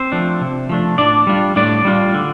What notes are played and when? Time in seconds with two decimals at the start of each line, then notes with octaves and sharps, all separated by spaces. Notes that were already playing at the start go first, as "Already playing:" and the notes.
Already playing: C4 C5
0.12 F3 A3 D4
0.41 C3
0.69 F3 A3 D4
0.98 A2 D4 D5
1.27 G3 D4 F4
1.56 A2 D4 D5
1.85 G3 D4 F4
2.14 D3